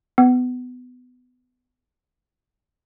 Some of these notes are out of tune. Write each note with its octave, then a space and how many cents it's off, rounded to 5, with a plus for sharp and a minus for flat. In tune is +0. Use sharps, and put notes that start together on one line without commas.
B3 +20